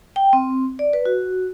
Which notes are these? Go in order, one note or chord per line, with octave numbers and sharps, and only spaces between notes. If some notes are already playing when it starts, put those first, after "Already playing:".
G5
C4
D5
B4
F#4